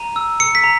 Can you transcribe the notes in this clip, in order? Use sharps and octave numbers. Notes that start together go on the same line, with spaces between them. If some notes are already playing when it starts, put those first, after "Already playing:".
Already playing: A#5 D#7
E6
E6 C#7
B6
A#5